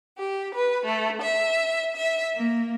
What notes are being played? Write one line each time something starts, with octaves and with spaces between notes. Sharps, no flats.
G4
B4
A3
E5
E5
A#3